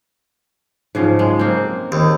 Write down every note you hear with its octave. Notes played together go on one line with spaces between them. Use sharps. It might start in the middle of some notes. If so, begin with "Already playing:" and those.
G#2 C#3 F3
G#3
A#3 C4
D#2